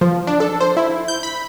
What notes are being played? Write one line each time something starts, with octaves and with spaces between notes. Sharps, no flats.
F3
D4
A4
C5
E4
G6
B5